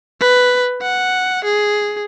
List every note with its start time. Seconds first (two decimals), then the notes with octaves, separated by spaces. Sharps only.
0.21 B4
0.82 F#5
1.45 G#4